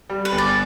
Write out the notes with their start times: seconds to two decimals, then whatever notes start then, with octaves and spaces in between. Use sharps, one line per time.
0.10 G3
0.25 B4
0.32 G1
0.38 D5